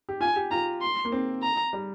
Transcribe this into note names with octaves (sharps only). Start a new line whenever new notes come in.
G4
F4 G#5
G4
F4 A#5
C6
A#3
C4
A#5
G3